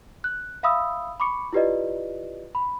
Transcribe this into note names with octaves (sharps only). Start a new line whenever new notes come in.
F#6
E5 F5 B5 D#6 E6
B5 C#6 D6 C#7
E4 F4 G4 B4 D5 D#5
B5